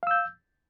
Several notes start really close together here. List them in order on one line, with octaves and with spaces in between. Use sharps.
F5 E6 G6